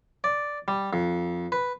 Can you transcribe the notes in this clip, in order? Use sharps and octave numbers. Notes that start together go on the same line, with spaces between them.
D5
G3
F2
B4